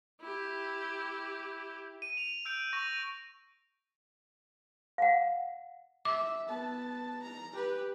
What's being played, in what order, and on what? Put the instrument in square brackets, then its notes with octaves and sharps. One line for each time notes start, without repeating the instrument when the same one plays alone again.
[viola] E4 G4
[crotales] D#7
F7
E6 G6 D7
C#6 A#6
[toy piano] F5 F#5
[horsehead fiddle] E5 [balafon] D6
[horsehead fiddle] B3 A5
A#5
G4 B4